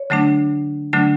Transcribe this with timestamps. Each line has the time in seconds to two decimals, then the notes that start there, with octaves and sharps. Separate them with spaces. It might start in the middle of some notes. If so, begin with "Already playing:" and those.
Already playing: C#5
0.10 D3 F#3 A3 D4
0.93 D3 F#3 A3 D4